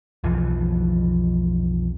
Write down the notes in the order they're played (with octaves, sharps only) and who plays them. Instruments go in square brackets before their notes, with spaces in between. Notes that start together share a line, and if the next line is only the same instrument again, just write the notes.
[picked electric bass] B1 F2 E3 F3